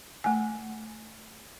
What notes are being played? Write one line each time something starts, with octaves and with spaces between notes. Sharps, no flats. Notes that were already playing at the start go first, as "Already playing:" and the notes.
A3 G#5